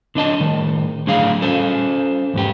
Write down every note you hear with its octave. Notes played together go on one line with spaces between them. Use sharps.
D3 D4 D#5 A5
A2 D#3
A2 D3 F#3 G#4 F5
C#4 A4 C5
E2 G#2 G4